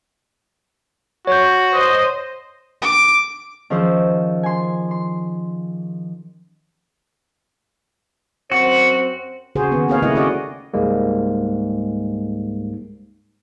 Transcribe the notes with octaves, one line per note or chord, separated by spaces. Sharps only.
F#4 C#5 G6
C5 D#5
D6
D#3 F3 C#4 G#4 C5 E6
G#5 C6
C6
F#2 C4 F#4 C5
C#3 F#4 G#4 C5
D#3 B3
A#3 C4 G#4 B4 C#5 F5
C#3 A3 E4 D#5 F#5
F#4 D5 D#5
C#2 G#2 G3 G#3 A#3